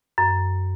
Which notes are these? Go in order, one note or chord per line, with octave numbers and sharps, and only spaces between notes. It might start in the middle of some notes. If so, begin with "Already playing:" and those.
F#2